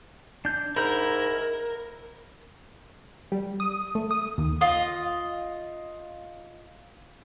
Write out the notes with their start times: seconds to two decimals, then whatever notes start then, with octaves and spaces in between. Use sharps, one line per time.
0.45 D4 G6
0.76 G#2 E4 A#4 B5 G6
3.32 G3
3.60 D#6
3.95 A3
4.11 D#6
4.38 D#2
4.61 F4 D#5